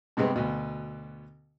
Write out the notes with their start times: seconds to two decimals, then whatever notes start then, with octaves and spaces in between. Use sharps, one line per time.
0.17 G2 C3 G#3 B3 C4
0.36 D2 B2